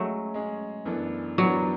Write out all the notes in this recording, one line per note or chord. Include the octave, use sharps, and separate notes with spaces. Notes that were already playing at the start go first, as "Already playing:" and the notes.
Already playing: F#3 G#3 A3 C#4 G#4
G#3 C#4 G#4
F#2 E3 B3 D4 A4
F#2 E3 F#3 B3 D4 A4